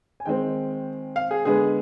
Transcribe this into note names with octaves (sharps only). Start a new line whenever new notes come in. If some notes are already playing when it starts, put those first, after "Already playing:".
G#5
D#3 G#3 C4 G5
F5
G#4
D3 G#3 B3 G#4